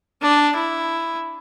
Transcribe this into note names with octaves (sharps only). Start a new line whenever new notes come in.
D4
E4